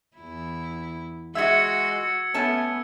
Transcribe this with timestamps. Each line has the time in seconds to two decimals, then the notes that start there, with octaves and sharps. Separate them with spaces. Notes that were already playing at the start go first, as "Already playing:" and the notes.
0.17 E2 E4
1.35 G#3 F#4 G#4 E5 E6 G#6 C#7
2.34 A3 B3 C#4 C#5 A5